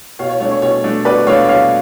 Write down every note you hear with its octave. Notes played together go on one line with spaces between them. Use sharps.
B2 C#5 F5
C#5
A3 D4 C#5
C#5
B2 C#5
A3 D4
B2 B4 D5
A3 D4 C#5 F5
B2 C#5 F5